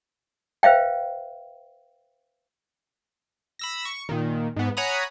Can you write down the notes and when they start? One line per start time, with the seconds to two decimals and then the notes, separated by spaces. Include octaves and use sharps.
0.63 B4 C5 E5 F5 G5
3.59 B5 E6 A#6
3.85 C#6
4.09 A#2 D#3
4.56 G#2 B3
4.77 C#5 F#5 G#5 A#5 B5 D#6